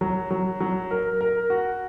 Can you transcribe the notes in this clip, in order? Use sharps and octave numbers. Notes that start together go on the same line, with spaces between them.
F#3
F#3
F#3
A#4
A#4
F#4